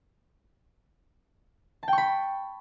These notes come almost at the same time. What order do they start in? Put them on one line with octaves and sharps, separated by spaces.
A5 G5 C#6 B5